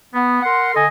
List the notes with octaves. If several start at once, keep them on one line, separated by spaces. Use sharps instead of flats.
B3
A#4 F#5 C6
D3 A4 D#5 G#5